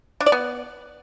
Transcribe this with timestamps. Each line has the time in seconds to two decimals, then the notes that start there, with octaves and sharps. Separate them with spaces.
0.20 D4
0.26 D5
0.32 B3